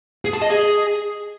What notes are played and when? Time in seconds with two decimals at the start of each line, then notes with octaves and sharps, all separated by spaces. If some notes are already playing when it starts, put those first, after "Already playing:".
0.25 G#4
0.33 A5
0.42 D#5
0.50 G#4